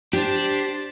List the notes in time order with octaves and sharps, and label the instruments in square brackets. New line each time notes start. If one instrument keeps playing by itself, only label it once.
[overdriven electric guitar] D4 [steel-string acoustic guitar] G4 [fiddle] C5 A5